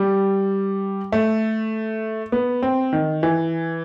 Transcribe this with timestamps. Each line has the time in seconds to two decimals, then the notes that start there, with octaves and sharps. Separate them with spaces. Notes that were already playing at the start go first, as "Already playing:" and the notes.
Already playing: G3
1.12 A3
2.32 B3
2.62 C4
2.93 D#3
3.23 E3